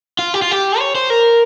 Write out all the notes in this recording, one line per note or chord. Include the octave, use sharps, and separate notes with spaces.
F4
G4
F4
G4
C#5
C5
A#4